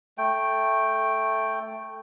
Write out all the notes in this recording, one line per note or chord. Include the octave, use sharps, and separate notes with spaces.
A3 G5